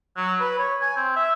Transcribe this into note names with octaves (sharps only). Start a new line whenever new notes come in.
F#3
B4
C#5
G#5
C4
E5